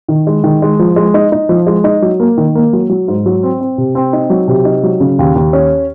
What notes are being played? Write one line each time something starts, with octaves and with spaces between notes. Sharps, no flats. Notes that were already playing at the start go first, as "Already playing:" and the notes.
D#3
G#3
D#3
G#3
F3
G#3
D#4
D#4
F3
G#3
D#4
F#3
A#3
D#3
A#3
F#3
F#3
G#2
F#3
C4
C4
C3
C4
D#4
F#3
C3
D#4
F#3
C#3
D#2
D#2
C#4